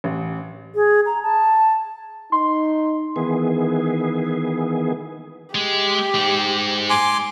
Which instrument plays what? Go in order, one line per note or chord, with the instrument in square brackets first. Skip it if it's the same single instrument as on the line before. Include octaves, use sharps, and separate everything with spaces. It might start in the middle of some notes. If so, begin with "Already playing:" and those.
[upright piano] A1
[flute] G#4
A#5
A5
[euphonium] D#4 [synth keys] C6
[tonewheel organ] D#3 E3 B3 G#4
[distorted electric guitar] G#3 [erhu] G4
[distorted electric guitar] G#2 G#3
[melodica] G#5 C6 D6